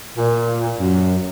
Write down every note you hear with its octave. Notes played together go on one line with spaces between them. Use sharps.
A#2
F#2